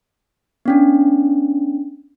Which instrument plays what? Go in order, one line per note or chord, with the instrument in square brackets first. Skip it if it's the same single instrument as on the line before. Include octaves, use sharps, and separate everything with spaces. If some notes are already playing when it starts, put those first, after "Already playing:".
[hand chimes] B3 C#4 D4